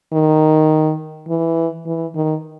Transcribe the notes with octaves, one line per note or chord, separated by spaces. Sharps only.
D#3
E3
E3
D#3